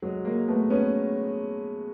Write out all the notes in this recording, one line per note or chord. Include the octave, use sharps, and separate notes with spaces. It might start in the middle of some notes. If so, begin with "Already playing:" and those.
F#3 G#3
G#3 A#3
A3 B3
B3 C#4